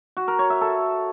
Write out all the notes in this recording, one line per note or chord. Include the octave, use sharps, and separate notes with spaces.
F#4
A#4
C#5
E5
A4